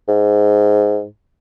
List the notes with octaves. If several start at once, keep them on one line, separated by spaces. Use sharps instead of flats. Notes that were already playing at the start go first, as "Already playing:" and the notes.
G#2